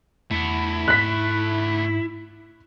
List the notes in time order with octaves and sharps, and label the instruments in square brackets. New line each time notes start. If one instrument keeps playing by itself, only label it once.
[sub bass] E2 [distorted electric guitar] A3 F#5 [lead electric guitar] E4
[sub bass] G#2 [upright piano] F#6 B6